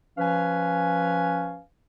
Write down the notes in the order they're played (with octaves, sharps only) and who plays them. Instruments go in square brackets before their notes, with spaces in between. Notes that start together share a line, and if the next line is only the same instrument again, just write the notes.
[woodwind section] F3 C#4 B4 F5 G#5